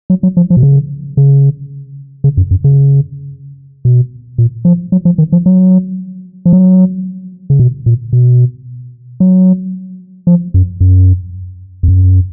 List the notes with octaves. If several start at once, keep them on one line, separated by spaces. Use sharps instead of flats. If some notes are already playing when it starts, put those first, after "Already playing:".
F#3
F#3
F3
F3
B2
C#3
C#3
C#3
F#2
F#2
C#3
B2
A#2
F3
F#3
F3
D#3
F3
F#3
F3
F#3
C#3
B2
A#2
B2
F#3
F3
F#2
F#2
F2
F#2